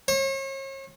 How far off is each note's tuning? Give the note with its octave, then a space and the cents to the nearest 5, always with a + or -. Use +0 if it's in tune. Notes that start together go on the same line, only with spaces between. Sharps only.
C#5 -40